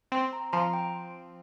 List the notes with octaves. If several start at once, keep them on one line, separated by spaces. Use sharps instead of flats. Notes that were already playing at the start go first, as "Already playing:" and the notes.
C4
A#5
F3 A#5
G5